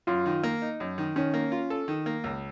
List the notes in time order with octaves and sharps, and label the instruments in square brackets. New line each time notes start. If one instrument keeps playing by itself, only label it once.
[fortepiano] F#2 [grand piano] F4
[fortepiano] D#3
A#3
D#4
F#2
D#3
[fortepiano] D#3 [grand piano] C#4
[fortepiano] A#3
F4
A4
D#3
A#3
C#2